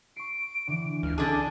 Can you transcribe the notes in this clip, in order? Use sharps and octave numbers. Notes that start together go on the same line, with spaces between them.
C#6 C7 D7
D3 E3
C#2 F6
D3 D4 G#4 D6 D#6